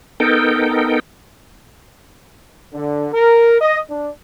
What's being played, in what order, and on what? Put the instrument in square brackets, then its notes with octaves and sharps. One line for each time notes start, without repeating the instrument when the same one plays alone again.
[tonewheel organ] B3 D#4 A4 A#4 G5
[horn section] D3
A#4
D#5
D4